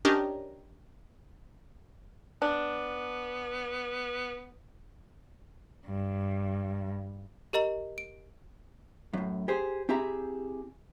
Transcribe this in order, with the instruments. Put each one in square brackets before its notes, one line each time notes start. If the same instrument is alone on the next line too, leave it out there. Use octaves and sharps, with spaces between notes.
[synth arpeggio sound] C#4 D4 G4 A#4 D#5
[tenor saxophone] B3 [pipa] D4
[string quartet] G2
[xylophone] G4 A#4 D#5 A#5 F#7
D7
[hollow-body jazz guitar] F#2 A2
G4 G#4 C5
C4 E4 G4 G#4 E5 A#5